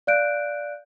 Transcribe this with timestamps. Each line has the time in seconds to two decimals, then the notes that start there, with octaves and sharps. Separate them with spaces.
0.07 D5 F5 F#6 G6 D7